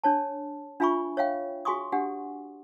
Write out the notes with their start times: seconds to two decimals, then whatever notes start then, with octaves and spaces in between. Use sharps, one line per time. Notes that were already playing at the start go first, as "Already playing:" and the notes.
0.04 D4 C#5 A5
0.80 D4 F4 E5 G#5 B5 C#6
1.17 C#5 E5 F5 G5
1.65 F#4 G#4 G#5 C6 C#6 D#6
1.92 D4 G4 F#5 G#5